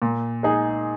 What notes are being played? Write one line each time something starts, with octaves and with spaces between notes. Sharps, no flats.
A#2
G#3 D#4 G#4